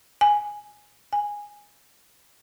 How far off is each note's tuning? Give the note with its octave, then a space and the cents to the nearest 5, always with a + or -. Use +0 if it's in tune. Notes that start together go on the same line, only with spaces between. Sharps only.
G#5 +0
G#5 -10